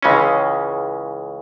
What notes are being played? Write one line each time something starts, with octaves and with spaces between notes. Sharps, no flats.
C#2 C#3 E3 G#3 C#4